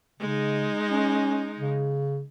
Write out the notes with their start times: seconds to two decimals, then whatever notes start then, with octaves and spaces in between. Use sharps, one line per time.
0.20 C#3 G#3 D#4
0.91 C#4
1.59 C#3